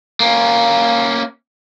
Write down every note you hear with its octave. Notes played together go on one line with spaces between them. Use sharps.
A#3 C#4